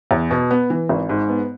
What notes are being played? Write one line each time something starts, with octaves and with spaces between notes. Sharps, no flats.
E2
B2
B3
E3
G#1
G#2
B3